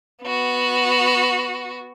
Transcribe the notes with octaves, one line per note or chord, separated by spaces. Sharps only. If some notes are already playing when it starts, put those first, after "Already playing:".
B3 F#4